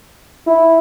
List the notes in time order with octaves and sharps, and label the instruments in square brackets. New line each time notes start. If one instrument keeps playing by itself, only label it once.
[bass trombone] E4